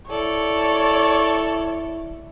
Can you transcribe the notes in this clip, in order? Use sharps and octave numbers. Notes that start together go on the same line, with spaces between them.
E4 A4 C#5 D5